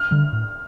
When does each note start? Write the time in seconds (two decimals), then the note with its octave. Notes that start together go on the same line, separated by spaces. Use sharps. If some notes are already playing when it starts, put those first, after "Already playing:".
Already playing: F6
0.11 D3 G3
0.33 A2